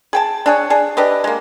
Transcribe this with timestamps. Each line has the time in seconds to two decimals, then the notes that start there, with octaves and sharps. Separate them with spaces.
0.13 G#4 G5 A5
0.46 D4 G#4 C#5
0.70 D4 G#4
0.97 D4 G4 B4 D#5
1.24 G#3 A#3